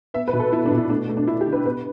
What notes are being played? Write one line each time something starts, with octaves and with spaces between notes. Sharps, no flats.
B3 E5
B4
B2
A4
B3 E4
D4
B2
E4
A3 D4
A3
D4
A3 E4
G4
D3
B4
B3 B4